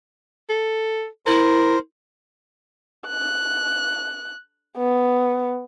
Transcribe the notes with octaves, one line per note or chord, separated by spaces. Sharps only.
A4
E4 A#4 C5
F#6
B3